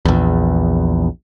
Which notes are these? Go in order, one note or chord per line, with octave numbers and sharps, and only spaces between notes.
A#1 E2